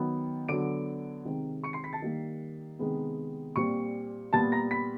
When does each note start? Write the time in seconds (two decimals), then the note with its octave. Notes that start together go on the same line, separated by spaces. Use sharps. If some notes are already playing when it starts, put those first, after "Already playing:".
Already playing: D#3 F#3 B3
0.49 D3 F#3 B3 D6 D7
1.25 C3 D#3 G#3 C4
1.63 C#6 C#7
1.73 C6 C7
1.84 B5 B6
1.93 A5 A6
2.02 D#3 G3 A#3
2.79 C3 D#3 G#3 B3
3.56 A#2 G3 C4 C#6 C#7
4.33 A#2 G3 B3 A5 A6
4.52 A#5 A#6
4.71 B5 B6